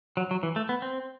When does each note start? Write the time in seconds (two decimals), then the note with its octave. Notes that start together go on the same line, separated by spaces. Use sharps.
0.17 F#3
0.31 F#3
0.43 E3
0.56 A3
0.69 B3
0.82 C4